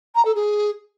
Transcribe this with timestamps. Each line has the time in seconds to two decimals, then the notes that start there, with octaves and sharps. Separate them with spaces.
0.15 A#5
0.25 A4
0.35 G#4